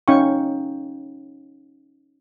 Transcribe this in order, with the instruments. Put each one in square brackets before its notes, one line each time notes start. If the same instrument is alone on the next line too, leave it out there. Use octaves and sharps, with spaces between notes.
[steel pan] C#4 D#4 F5 G5 C#6